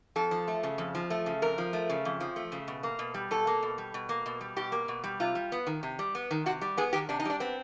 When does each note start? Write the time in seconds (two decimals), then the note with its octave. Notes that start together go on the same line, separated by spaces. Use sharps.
0.16 F2 A4
0.31 F3
0.48 A3
0.63 C#3
0.78 F2
0.95 F3
1.10 A3
1.26 C#3
1.42 F2 A#4
1.58 F3
1.73 A3
1.89 C#3
2.05 F2
2.20 F3
2.36 A3
2.52 C#3
2.68 B2
2.83 A#3
2.99 B2
3.14 G3
3.31 B2 A4
3.47 A#3
3.63 B2
3.78 G3
3.94 B2
4.09 A#3
4.26 B2
4.41 G3
4.56 B2 G4
4.72 A#3
4.88 B2
5.04 G3
5.20 C3 F4
5.35 G3
5.52 B3
5.67 D#3
5.83 C3
5.99 G3
6.15 B3
6.31 D#3
6.46 C3 F#4
6.61 G3
6.78 B3 G#4
6.93 D#3 G4
7.09 C3 D4
7.20 D#4
7.25 G3 D4
7.40 B3 C4